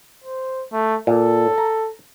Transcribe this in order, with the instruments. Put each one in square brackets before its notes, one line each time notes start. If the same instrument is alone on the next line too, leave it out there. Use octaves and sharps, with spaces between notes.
[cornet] C5
A3
[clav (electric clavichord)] A#2 [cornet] A4
[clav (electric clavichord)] A#5